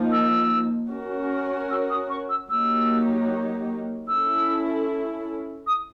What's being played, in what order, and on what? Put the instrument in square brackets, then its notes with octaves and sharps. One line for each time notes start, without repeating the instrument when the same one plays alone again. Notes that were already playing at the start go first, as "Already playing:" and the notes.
Already playing: [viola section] F3 A#3 D#4
[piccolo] E6
[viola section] C#4 F#4 A#4
[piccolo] E6
D#6
C#6
E6
[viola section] F#3 A#3 D#4 G4 [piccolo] E6
[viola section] C#4 E4 A4 [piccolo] E6
[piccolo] D#6